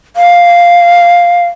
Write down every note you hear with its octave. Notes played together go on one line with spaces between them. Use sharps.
F5